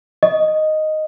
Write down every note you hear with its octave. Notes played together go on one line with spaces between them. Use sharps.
D#5